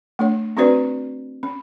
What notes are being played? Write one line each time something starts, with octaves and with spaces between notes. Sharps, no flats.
A3 D4 C#5
C4 D4 F#4 B4 C5 D5
C#4